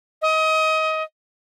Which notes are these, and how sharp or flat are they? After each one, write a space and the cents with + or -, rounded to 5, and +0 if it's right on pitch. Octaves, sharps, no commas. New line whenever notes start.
D#5 +25